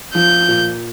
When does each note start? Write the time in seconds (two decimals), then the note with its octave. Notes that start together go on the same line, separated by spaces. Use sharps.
0.15 F3 G6
0.48 A#2